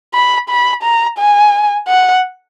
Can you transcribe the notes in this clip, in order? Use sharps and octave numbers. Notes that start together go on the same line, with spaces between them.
B5
B5
A#5
G#5
F#5